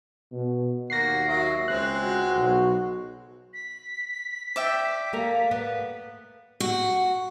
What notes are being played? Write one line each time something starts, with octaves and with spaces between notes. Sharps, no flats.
B2
D#2 A#3 F#4 A#6 C7
F#3 E5
C#2 G#3 C4 F#6
F#4
B1
B6
D5 E5 G5
A#3 A4 A#4
B3
F#4